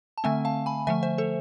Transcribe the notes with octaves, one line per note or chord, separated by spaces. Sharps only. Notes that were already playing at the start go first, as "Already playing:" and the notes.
A5
D3 A3 C4 E5 G#5
F5 A5
G#5 B5
D3 F3 A3 E5 G#5
C5 E5
A4 C5